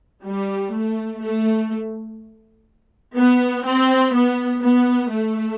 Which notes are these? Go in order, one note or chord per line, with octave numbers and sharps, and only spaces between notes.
G3
A3
A3
B3
C4
B3
B3
A3